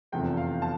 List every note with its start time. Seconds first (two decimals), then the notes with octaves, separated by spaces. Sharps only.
0.12 F1 E2 C3 F3 G5
0.37 F5
0.62 A5